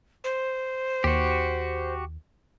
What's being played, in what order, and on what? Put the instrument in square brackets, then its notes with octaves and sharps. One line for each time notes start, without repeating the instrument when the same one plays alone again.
[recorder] C5
[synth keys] D#2 [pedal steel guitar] F#4 G4